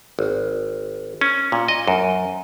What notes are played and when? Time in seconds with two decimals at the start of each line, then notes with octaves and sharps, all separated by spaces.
0.19 G#1
1.21 C#4
1.52 A#2
1.68 D#5
1.88 F#2